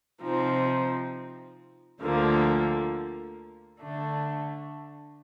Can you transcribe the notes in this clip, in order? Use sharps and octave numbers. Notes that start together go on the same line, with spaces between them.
C3 F3 C4 D#4
D2 D3 F3 A#3
D3 A3 D4